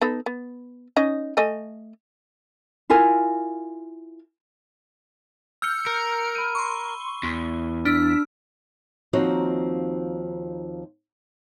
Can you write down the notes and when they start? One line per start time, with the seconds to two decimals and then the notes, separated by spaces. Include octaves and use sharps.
0.01 B3 D#4 A4
0.26 B3
0.96 C#4 D#4 D#5
1.37 A3 D#5 G#5
2.90 E4 F4 A#4 G#5
5.62 E6 F6 G6 C#7
5.87 A#4
6.35 B5 D#7
6.55 C6 C#6
7.23 E2
7.85 D4 E6 F6 B6
9.13 D#2 F3 C4 D#4 F#4 C#5